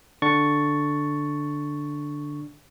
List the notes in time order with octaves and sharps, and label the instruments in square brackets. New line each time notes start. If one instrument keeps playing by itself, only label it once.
[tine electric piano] D3 D4 C#6 A6